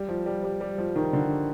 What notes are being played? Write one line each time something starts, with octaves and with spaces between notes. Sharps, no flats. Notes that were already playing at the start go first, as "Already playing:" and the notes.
Already playing: G3
F3
G3
G3
G3
F3
D#3
D3